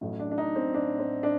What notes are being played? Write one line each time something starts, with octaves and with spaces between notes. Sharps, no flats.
A1 A2 F#3 A3
D4
D4
D#4
C4
D4
C4
D4